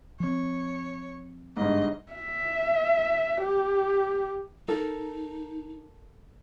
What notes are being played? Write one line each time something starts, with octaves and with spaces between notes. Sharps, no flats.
F3 C4 C#5
G1 G#2 D#5
E5
G4
D#4 A4 A#4